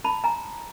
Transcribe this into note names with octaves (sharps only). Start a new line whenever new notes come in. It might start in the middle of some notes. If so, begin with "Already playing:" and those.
A5 B5
G#5 A#5